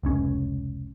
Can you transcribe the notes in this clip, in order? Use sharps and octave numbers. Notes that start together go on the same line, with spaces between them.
F1 C#2 C#4